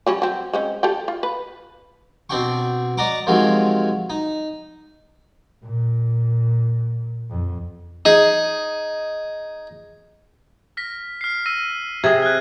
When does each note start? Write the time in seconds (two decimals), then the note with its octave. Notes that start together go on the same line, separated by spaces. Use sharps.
0.06 F#3 G3 C#4
0.22 F#3 C4
0.53 G#3 C4 C#4
0.83 G4 A4 G5
1.08 F4
1.23 B4
2.30 B2 C4 D4 G5 C#6
2.97 D5 D#5 F#5 A#5 C#6 D6
3.27 C3 D#3 F3 F#3 G#3
4.10 D#4
5.64 A#2
7.30 F2
8.05 D#4 G#4
10.77 F6 A#6 B6
11.21 F6 C7
11.46 E6 A#6 D#7
12.04 C3 G#4 G#6
12.22 F6 F#6